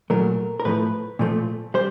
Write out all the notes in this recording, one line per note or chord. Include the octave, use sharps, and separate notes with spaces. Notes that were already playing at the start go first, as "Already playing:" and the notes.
A#2 F#3 A3 A#4
A#4
A2 F3 A3 B4
A#2 F3 A3
G3 C5